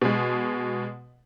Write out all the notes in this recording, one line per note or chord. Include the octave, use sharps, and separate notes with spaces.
B2 G#3